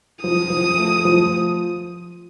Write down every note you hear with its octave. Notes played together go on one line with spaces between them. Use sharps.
F3 D#6
F3
A3
F3